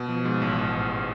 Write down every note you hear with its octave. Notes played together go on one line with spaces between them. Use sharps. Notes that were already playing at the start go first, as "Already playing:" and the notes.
Already playing: B2
F3
G#2
A1
A1